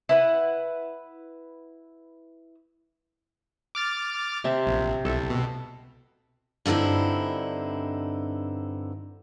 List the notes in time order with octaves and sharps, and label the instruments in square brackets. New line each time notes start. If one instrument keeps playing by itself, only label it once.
[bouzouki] E4 B4 F#5
[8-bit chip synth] D6 F6 A6
[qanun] C3 E5 A5
[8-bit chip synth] A#1
[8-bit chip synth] C2 [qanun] A4 E5
[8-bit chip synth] B2
[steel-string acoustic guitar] G2 D3 C4 D#4 E4